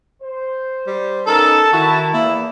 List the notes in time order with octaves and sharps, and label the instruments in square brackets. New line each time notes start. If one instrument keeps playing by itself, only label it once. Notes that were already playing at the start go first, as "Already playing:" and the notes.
[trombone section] C5
[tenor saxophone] G3
[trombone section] B3 C#4 D#4 [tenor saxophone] A4 [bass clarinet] A#4 [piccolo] A5
[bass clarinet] D#3 [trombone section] E4 [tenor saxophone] F#4
[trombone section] E2 [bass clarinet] A#3 [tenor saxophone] E4